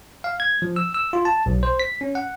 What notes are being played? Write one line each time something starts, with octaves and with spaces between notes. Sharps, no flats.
F5
G#6
F3
E6
E6
F4
A5
B1
C5
B6
C#4
F#5